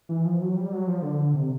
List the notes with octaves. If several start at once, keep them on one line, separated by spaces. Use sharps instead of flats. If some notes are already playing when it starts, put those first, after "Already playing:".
E3
F3
F#3
G3
F#3
F3
D3
C3